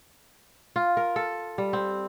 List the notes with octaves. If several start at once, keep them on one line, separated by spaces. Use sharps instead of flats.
F4
A#4
A4
G3
C4